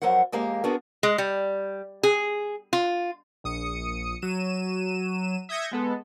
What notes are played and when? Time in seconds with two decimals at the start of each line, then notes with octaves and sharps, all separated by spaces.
0.02 F2 F#3 A#4 C5 F#5
0.32 F2 G#3 A#3 G4 A#4 F5
0.64 B3 C4 D4 F#4 G#4 A#4
1.03 G#3
1.18 G3
2.03 G#4
2.73 F4
3.44 A#1 D#6 C#7
4.22 F#3 D#7 E7
5.49 E5 D#6 G6 G#6 A#6 C#7
5.71 G#3 B3 A4